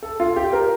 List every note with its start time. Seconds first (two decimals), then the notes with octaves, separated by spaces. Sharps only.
0.03 A4
0.20 F4
0.36 G4
0.53 A#4